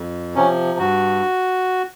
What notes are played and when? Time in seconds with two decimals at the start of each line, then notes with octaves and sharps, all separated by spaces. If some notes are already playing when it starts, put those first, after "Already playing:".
Already playing: F2
0.35 C3 F3 C#4
0.79 G2 F#4